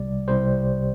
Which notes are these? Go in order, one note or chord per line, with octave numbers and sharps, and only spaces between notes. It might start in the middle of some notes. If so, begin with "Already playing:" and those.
Already playing: C2 C3 G3 D5
C2 C3 G3 C5